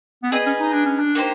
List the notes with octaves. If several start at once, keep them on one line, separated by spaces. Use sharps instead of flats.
B3
C4 G#4 B4 D#5
C#4
D#4
D4
C#4
D4
A#3 D#4 G4 C5